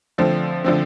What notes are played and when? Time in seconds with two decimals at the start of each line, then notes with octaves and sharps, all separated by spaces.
0.18 D3 F3 A3 C4
0.65 D3 F3 A3 C4